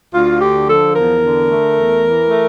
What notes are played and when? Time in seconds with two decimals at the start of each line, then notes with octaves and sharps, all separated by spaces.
0.13 D2 F4
0.40 D3 G4
0.67 F3 A4
0.94 E2 A#4
1.21 D3
1.49 A3
1.76 E2
2.03 E3
2.30 A3